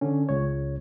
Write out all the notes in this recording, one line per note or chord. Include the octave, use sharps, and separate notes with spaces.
D3 C#4
C#2 C#5